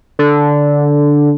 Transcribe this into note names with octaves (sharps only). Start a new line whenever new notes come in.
D3